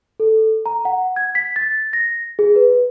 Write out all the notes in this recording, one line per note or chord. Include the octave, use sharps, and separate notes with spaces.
A4
A#5
F#5
G#6
B6
A6
A#6
G#4
B4